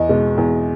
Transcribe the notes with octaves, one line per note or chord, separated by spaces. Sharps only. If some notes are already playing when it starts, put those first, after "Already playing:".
Already playing: E2 D#5
B2 G#3
E2